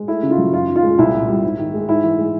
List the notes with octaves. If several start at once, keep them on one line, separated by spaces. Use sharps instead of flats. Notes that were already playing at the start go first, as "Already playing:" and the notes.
Already playing: G#3
A3 E4
C#3
F4
F#3
F#2 F4
D#3
F4
G#3
C2 E4
A#2
G3
G#2
D#3
G#3
G#2 E4
E3
G#3